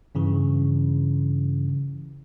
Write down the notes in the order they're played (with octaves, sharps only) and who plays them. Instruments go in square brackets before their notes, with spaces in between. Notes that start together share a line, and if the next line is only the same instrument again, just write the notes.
[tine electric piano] G2 C#3 E3